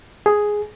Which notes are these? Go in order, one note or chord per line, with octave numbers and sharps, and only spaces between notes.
G#4